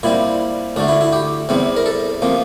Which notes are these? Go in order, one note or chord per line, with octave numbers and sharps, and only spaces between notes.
A#2 G3 C4 E4
D2 D3 A3 D4
E4
E4
G4
E2 C3 G3 C4
A#4
A4
C3 F3 A#3